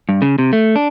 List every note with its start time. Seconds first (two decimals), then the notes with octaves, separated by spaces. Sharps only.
0.09 G2
0.22 C#3
0.39 C3
0.53 A3
0.76 D4